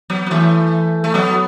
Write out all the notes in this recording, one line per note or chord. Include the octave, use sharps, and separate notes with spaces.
F#3 B3
B3
E3 A3
A3
F#3 B3